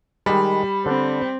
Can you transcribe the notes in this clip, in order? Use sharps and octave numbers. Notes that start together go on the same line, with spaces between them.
D#3 G3 G#3 B5
D3 C4 D4